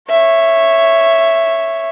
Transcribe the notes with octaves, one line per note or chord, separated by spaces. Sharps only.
C#5 E5